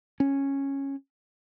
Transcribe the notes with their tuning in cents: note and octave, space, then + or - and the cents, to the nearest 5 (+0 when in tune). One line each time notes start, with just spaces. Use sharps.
C#4 -10